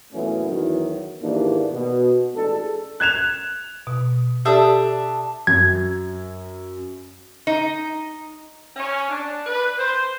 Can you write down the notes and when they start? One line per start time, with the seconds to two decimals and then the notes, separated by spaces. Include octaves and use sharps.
0.13 F#2 A#2 E3 A3 B3 C#4
0.48 E2 D#3 E3 F#3
1.22 D#2 G#2 E3 A#3 D4
1.72 B2
2.35 A1 G#3 D4 G#4 A4
3.00 F#6 G#6 E7 F7
3.87 B2
4.45 D4 G4 A4 D5 E5 D#6
5.47 F#2 G#6
7.47 D#4
8.76 C#4
9.10 D4
9.47 B4
9.79 C5